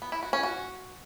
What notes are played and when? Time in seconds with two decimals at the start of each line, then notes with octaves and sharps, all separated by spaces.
0.02 B3
0.12 E4
0.23 F#4
0.33 C#4
0.43 F#4